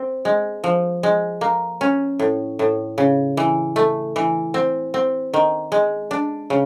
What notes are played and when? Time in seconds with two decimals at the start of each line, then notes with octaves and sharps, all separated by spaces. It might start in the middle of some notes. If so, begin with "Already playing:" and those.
Already playing: C4
0.25 G#3
0.64 F3
1.03 G#3
1.41 A#3
1.81 C#4
2.19 A2
2.59 A2
2.98 C#3
3.37 E3
3.76 A3
4.16 E3
4.54 C4
4.94 C4
5.34 D#3
5.72 G#3
6.11 D4
6.50 C#3